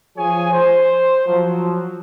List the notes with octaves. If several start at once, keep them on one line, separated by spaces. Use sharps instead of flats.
F3 G#4 C#5 G#5
C5
F3 F#3